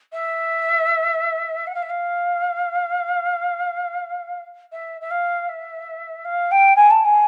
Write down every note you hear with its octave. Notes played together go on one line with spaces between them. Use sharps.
E5
F#5
F5
E5
F5
E5
E5
F5
E5
F5
G5
G#5
A5
G#5